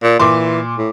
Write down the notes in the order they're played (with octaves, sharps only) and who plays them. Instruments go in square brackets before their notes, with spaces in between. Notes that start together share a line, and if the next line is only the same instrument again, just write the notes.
[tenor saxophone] A#2
[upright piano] A#2 C6 D6 [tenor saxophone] E3
[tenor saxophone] A2